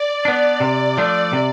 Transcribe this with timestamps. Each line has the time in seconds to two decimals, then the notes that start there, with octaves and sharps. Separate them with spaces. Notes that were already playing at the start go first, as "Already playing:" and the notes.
Already playing: D5
0.25 B3 D4
0.60 C3
0.97 F3 A3 D4
1.33 C3